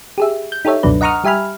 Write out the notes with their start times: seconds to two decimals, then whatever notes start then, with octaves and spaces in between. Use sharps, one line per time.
0.18 G4 G#4 E5
0.52 G6
0.65 D#4 G4 A4 C#5 E5
0.83 C#2 F#2 B2 F#3 D4 B4
1.01 D#5 F#5 A#5 C#6 D#6 F6
1.24 G3 G4 E5 G#5 B5 F6